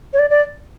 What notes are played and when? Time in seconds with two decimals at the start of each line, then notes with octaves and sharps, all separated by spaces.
0.13 C#5
0.19 D5
0.30 D5